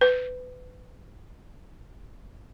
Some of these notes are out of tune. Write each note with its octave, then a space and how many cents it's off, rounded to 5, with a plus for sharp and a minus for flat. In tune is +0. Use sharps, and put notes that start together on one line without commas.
B4 +25